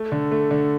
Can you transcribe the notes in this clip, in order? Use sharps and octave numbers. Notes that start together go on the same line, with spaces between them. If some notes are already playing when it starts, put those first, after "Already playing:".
Already playing: A3
D3
A3
D3